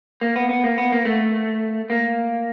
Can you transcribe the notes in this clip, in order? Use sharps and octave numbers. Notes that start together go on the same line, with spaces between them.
A#3
B3
B3
A#3
B3
A#3
A3
A#3